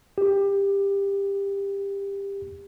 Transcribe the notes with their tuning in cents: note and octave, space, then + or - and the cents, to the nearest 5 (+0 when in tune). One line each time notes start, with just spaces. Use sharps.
G4 +20